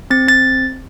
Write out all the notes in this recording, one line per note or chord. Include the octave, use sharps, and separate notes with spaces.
C4 A6
C4 A6